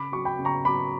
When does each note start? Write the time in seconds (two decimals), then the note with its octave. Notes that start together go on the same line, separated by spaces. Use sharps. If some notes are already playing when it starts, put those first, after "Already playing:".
Already playing: C#3 B5 D6
0.12 F#3 C#6
0.25 G5 B5
0.39 C#3
0.45 A#5 C#6
0.65 F#3 B5 D6